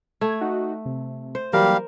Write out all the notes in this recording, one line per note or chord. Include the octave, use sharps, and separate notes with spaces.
A3 G#6
D#4 F#4
C3
C5
E3 F#3 G3 A#3 G4 A#4 F5